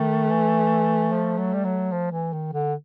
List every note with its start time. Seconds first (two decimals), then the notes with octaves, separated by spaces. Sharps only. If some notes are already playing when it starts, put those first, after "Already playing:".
Already playing: D#3 A3
0.30 E3
1.11 F3
1.38 F#3
1.54 G3
1.65 F#3
1.92 F3
2.12 E3
2.33 D#3
2.53 D3